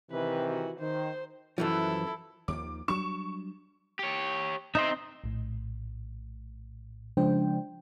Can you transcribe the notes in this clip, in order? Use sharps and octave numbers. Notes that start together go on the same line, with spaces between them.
C3 D#3 E3 B4
F#4
D#3 C5
F#2 E3 F3 E4 A4
D#2 D#3 F3 D6
F#3 G3 D4 C#6 E7
G4 C#5
C4 D#4 D#5 E5 C6
A#1 A2
C#3 F3 G#3 D4 C5 G5